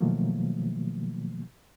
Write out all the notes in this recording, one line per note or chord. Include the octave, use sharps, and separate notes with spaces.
B2 D#3 F3 F#3 A3 A#3